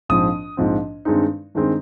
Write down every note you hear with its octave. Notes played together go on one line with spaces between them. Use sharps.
A#1 G#2 F3 C4 D#6
A#1 G#2 F3 C4
G2 D#3 G#3 C4 D#4
G2 D#3 G#3 C4 D#4